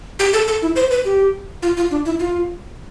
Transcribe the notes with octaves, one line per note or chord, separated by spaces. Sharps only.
G4
A4
A4
E4
C5
B4
G4
F4
F4
D4
E4
F4